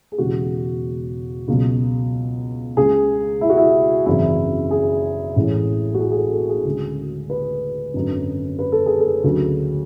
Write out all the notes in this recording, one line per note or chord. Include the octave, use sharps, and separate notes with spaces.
G#4
E1 E2 C#3 G#3 F#4
C#2 B2 F#3
C#2 C#3 G#3 G#4
E4
F#4
E4
G#1 F#2 C#3 E3 E4
G#4
A1 A2 E3 G#3
F#4
G#4
G#4
A4
A4
G#4
D2 C#3 G#3
B4
G#1 F#2 D3
B4
A4
G#4
A4
D2 C#3 F#3